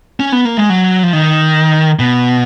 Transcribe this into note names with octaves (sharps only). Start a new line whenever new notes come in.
C#4
B3
A#3
G#3
F#3
F3
D#3
B2